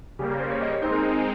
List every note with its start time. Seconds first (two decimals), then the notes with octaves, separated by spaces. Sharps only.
0.19 C#3 G3 A#3 G4
0.29 A#4
0.39 C5
0.50 C#5
0.62 D#5
0.72 C#5
0.81 G#3 C4 D#4 C5
0.92 A#4
1.03 G#4